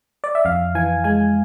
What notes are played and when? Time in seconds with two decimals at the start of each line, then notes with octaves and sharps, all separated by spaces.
0.24 D5
0.35 E5
0.45 F2 F5
0.75 E3 G#5
1.04 G#3 G#5